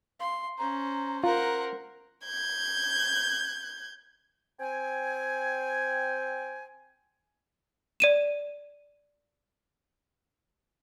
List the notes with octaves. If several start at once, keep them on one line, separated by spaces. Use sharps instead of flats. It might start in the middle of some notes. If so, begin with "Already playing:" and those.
F5 C6
C#4 C5 A#5
F4 A#4 C5 F#5 A#5
G6 G#6
C4 G5 G#5
D5 D#7 E7